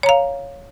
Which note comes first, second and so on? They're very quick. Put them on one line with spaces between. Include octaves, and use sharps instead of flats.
C#5 A#5 F5